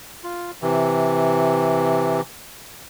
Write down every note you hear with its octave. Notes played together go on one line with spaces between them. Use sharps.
F4
C3 E3